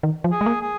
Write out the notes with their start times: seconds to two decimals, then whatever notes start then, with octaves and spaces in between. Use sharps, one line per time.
0.03 D#3
0.24 F3
0.31 G#4
0.41 G#3
0.46 A#3
0.61 G#4